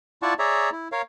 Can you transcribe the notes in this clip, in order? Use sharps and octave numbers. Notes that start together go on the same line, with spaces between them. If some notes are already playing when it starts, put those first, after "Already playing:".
E4 F4 D5 F#5 A5 C#6
G#4 C#5 D5 E5 A#5
E4
A#4 C#5 F5